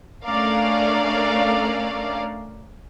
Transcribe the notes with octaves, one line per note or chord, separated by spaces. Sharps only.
A3 C#4 D4 A#4 D5 F5